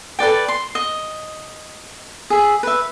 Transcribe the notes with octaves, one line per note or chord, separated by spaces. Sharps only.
A4 B4 D5 G5
C6
D#5
G#4 E5
B4 E5